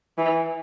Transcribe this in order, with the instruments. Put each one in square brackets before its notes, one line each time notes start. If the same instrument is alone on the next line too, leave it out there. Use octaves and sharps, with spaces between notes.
[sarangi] E3